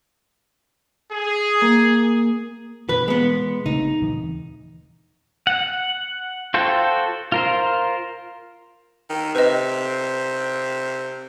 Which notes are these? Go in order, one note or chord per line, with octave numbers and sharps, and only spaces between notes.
G#4
A#3
B2 E3 B4
G#3 B3
C#3 A3 C4 D#4
D#1 E3
F#5
F4 F#4 A4 C5 G5
F4 A#4 C5
D#3
C3 B4 D#5